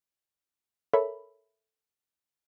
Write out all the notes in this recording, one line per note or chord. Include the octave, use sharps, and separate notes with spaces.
A4 A#4 C#5 E5 B5